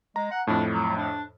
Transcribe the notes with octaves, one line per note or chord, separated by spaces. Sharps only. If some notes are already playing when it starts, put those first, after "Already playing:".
G#3 A#5
F#5
F2 A2 D4
F#3
D4